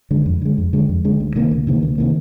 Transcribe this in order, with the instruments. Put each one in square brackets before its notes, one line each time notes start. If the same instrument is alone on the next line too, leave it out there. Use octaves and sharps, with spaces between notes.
[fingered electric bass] D3 G#3
F2
D3 G#3
F2
D3 G#3
F2
D3 G#3
D2
C3 D#3 A#3
D2
C3 D#3 A#3
D2
C3 D#3 A#3